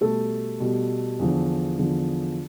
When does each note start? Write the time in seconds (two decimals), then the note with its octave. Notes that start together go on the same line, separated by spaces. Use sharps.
0.01 B2 G3 A3 A4
0.60 B2 G3
1.19 E2 D3 F3
1.78 E2 D3 F3